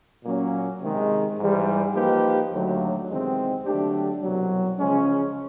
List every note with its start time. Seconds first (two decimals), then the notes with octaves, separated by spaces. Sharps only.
0.24 A#2 F#3 A#3 C#4
0.81 C3 D#3 G#3
1.39 G#2 E3 G3
1.95 F3 A#3 D#4 G4 B4
2.51 D#2 D3 F#3 A3
3.09 E2 C3 D#3 G#3 C4
3.65 D3 F#3 A3 D4 G4
4.22 C2 B2 F#3
4.79 C#3 F3 G#3 C#4